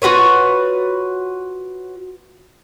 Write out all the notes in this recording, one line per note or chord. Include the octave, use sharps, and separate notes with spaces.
F4 F#4 B4 C#5